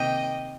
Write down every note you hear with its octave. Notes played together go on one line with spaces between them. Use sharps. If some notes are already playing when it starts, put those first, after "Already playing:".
Already playing: C3 D#3 A#3 D#5 G5